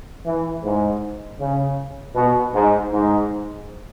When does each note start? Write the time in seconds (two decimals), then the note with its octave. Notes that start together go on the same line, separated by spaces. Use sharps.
0.25 E3
0.63 G#2
1.40 C#3
2.15 B2
2.54 G#2
2.92 G#2